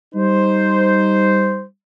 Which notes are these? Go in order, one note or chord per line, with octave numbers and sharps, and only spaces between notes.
G3 D#4 C5